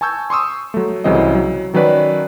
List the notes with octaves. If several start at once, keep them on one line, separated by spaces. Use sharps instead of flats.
G#5 A5 C#6 E6 G6 G#6
C6 C#6 D#6 E6
F#3 A3
C2 C#3 E3 F#3 C4 D#5
F#3
D#3 F#3 C#4 B4 D5